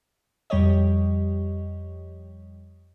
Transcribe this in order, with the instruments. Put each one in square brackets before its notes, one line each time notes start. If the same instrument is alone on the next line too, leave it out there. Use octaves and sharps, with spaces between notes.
[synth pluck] F2 G3 G4 C#5 D#5